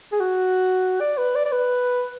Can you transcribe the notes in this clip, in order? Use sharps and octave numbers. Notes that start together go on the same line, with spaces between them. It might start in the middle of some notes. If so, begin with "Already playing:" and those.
G#4
F#4
D5
B4
D5
D5
B4